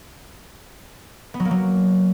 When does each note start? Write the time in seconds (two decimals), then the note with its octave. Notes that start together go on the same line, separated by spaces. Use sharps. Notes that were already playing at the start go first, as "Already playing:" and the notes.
1.34 B3
1.40 F#3
1.45 A#3
1.51 F#3